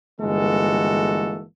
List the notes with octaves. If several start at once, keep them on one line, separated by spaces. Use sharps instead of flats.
G1 E3 G#3 A#3 F#4 A4